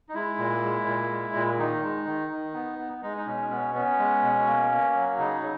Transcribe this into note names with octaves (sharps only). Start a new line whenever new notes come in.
D#4
G#3 E4
A#2
G#3
A#2
G#3
A#2
D#3 D#4
G#3
D#3
D#3
B3
B3
G#3 D#4
D#4
B2 C#4
B3 C#4
B3 C#4
G#3
B2
A#3
A#3
F#3
C#3 D#4
C#3